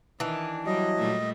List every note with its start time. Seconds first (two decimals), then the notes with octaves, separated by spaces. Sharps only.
0.20 D#3 E3 D4
0.66 F#3 G3 D#5
0.99 A#2 G3 A3